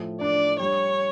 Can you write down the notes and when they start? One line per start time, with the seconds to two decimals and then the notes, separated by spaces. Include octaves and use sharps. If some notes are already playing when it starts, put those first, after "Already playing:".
Already playing: A2 F3
0.21 D4 D5
0.59 G3 C#5